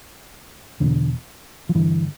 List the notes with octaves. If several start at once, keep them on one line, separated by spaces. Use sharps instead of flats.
E2 B2 D3
F3
G2 D3 E3